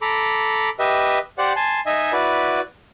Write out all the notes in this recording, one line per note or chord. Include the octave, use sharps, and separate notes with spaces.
A4 A#5 B5 D6
G4 B4 D#5 E5
G4 C5 D5 F#5
G#5 A5 C6
D#4 D#5 E5 G#5
E4 F#4 B4 D5